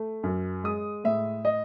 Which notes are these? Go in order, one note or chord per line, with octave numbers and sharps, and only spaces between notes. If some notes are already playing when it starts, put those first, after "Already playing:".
Already playing: A3
F#2
G#3 D#6
A2 E5
D#5